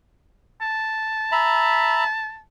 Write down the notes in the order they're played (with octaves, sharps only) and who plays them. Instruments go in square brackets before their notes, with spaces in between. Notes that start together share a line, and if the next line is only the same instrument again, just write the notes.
[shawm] A5
[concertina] E5 A#5 B5